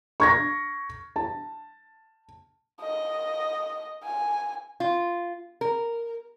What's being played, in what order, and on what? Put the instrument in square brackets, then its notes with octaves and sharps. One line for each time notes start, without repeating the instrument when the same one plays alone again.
[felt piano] C#6 G#6 A#6
A5
[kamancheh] D#5
G#5
[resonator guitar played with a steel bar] F4
A#4